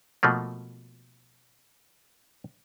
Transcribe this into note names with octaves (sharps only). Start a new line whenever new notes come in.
B2 F3 A3 A#3